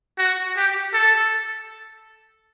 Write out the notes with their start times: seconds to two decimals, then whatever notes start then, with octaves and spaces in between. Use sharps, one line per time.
0.19 F#4
0.57 G4
0.94 A4